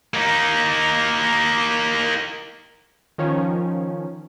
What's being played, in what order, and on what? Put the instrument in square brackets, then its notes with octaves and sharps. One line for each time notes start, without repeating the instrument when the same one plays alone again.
[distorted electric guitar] A#3 D#4
[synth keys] D#3 F3 C#4